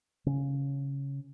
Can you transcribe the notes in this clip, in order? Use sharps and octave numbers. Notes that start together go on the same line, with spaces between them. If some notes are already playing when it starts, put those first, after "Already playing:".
C#3 C#4